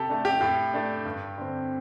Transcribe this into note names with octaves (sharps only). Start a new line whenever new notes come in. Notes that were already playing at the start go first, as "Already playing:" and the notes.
Already playing: C3 G4 A4
A3 D4
G4
A2 G4
A3 D4
G2
D3 C4